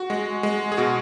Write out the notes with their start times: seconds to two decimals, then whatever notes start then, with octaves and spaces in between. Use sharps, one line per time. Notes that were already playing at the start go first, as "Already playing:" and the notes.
Already playing: F#4
0.10 G#3
0.43 G#3
0.72 G#4
0.77 B2 F#4